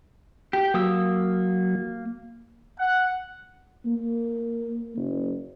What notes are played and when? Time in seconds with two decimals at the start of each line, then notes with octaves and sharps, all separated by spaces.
0.53 G4
0.74 F#3 A#3 D#6 E6
2.78 F#5
3.86 A#3
4.97 F#1